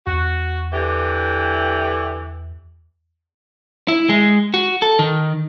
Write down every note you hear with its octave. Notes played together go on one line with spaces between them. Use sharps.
E2 F#4
D3 E3 G4
E4
G#3
F#4
A4
D#3